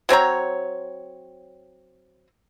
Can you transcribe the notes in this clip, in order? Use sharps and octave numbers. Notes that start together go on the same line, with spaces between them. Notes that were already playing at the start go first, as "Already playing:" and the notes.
F#3 C4 C#5 A#5